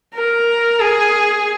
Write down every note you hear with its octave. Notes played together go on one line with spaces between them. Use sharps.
A#4
G#4